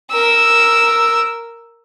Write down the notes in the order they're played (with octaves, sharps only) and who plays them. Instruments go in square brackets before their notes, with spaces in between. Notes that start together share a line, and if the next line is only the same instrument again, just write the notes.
[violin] A#4 E6